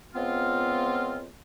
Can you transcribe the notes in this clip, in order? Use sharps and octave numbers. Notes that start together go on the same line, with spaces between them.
C#2 F3 B3 C4 F4